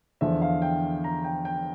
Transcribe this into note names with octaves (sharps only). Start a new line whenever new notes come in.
E2 D3 F3 E5
F5
G5
A#5
G5
G5